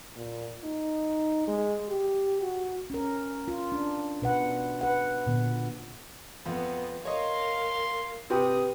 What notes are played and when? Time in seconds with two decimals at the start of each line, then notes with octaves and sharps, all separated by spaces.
0.16 A#2
0.64 D#4
1.48 G#3
1.89 G4
2.41 F#4
2.90 C#4 A#4
3.48 F4
3.72 D4
4.22 B2 B4 F#5
4.81 B4 F#5
5.26 A#2 D3 B3
6.46 F2 B3
7.05 A#4 C#5 D#5 F5 C6
8.30 C3 G4 B4 G5 D#6